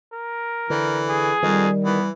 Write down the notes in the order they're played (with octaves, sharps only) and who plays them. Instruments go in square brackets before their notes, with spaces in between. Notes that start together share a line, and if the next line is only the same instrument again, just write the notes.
[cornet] A#4
[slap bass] D3 [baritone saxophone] E3
[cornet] G#4
[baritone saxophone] F2 [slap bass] D#3 [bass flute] G3
[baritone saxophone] E3 [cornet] B3